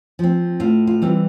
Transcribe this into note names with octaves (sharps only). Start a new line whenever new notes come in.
F3 C4
A2 F4
F4
E3 G3 C4